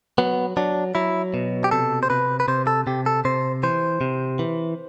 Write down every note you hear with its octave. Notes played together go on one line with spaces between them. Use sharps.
F#3 B3
F#3 D4
F#3 E4
B2
G4
C3 A4
C5
C3 B4
B4
C3 C5
A4
C3 G4
A4
C3 C5
E3 C5
C3
E3